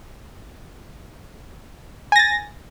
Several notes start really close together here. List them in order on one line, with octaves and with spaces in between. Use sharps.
G#5 A#6 A6